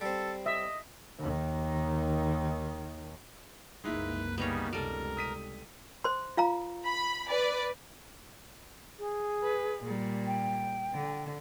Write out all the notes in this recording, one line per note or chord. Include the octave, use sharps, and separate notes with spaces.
G3 C4 A4
D#5 E5
D#2 D#3
F#1 C2 G#3 A#3 D#4 E4 B4
C#3 G3 B3 D#4 B4 C#5
C#2 C3 G3 A4 A#4
D#6 B6 D#7
C5 C6
F4 F5 A#5
B5
B4 D5
G#4
B4
A#2 G3
G5
D3